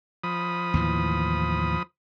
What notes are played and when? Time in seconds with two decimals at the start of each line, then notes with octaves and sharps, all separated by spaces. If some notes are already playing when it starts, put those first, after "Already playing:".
0.24 F3 B5 D#6
0.74 D#2 A2 E3